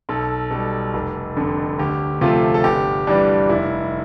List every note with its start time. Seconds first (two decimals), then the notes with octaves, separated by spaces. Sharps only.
0.09 B1 A4
0.51 B2 G3 A4
0.94 F1
1.37 F2 D3
1.79 D2 G4
2.21 C3 F3 A3 F4
2.54 A4
2.64 G1 G4
3.07 G2 E3 G3 D4
3.49 F1 E4